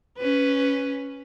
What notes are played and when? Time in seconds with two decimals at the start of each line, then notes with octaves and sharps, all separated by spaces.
0.18 C#4 B4